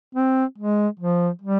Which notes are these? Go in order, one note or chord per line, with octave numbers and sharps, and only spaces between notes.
C4
G#3
F3
G3